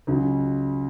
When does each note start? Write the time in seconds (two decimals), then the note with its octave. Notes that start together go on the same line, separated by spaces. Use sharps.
0.07 C#2 C#3 F#3